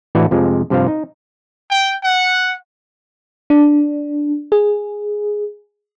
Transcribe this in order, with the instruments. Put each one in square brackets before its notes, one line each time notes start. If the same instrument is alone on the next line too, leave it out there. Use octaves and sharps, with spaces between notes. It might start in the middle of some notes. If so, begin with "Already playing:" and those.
[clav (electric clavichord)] A1 A2 E3 D4 F#4 D5
F2 C3 F3 G#3
G2 C3 F3 C5 F5
D#4
[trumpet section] G5
F#5
[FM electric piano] D4
G#4